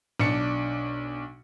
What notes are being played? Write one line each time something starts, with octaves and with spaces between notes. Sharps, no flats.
B1 D4 C#7